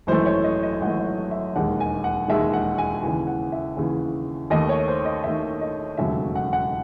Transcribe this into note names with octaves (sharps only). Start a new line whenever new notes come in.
G#1 F#2 E3 A3 C5
C#5
D#5
D#5
G#1 F#2 E3 A3 F#5
E5
E1 D#2 D#3 G#3 F#5
G#5
F#5
E1 D#2 D#3 G#3 E5
F#5
G#5
D#2 C#3 E3 G#5
F#5
E5
D#2 C#3 E3
D#2 D#3 A3 D#5
C#5
C5
D#5
D#2 D#3 A3 E5
D#5
E1 D#2 C#3 F#3 A3 E5
F#5
F#5